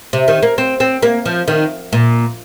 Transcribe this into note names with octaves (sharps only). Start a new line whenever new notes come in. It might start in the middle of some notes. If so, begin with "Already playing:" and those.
C3
D#3
A#3
C4
C4
A#3
F3
D#3
A#2